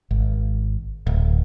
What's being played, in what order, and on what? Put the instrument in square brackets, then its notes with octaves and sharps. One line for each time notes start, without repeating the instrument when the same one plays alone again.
[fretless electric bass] G#1
D1